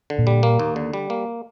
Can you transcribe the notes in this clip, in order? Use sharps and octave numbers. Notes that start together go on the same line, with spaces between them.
D3
A#2
G3
A#3
D#2
D3
G3
A#3